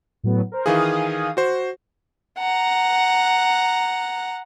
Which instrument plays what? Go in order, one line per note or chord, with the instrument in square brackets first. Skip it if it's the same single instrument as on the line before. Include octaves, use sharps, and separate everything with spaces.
[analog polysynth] A2 F#3 B3
A#4 C5
[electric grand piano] D#3 E3 G#4 [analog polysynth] F5 G#5 D#6
[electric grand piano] F#4 C5
[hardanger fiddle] F#5 A#5